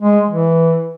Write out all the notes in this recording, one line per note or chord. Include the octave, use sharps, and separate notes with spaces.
G#3
E3